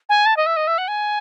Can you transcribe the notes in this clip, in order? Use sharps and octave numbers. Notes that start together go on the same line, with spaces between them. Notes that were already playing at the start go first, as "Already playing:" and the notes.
G#5
A5
D#5
E5
D#5
E5
F#5
G#5